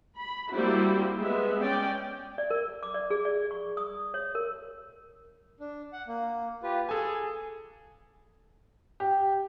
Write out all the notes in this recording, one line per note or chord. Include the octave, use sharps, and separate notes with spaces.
B5
G3 A#3 C4 E4 F#4
G#3 B3 E5
C#4 D5 G5
D5
A#4
D6
D5
G#4
D5
C#6
D#6
C#5
A#4
D4
F#5
A#3
F4 G4 B4
G#4 A4 G#5
G4